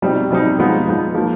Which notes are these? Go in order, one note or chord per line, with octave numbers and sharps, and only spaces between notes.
B2 G3 C4 D#4
B2 G3 C4 D#4
F3 G#3 B3 D#4
F3 G#3 B3 D#4
F3 A#3 D#4